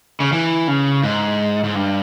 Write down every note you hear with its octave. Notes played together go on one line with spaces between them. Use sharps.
C#3
E3
C#3
G#2
G#2
G2